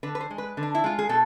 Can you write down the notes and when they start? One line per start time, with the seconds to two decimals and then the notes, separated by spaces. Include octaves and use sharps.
0.03 D3 B4
0.15 B4
0.21 C5
0.31 G#3
0.38 B4
0.57 D3
0.63 D4
0.75 E4
0.84 G#3 F4
0.99 G#4
1.09 B2 A4